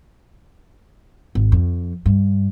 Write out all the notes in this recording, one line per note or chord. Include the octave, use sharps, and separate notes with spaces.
G#1
F2
G2